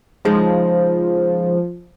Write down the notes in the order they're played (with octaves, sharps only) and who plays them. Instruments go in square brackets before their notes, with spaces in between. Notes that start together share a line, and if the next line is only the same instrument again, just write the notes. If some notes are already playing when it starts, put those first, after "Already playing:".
[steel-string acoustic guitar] C#3 G#3 D#4 [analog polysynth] F3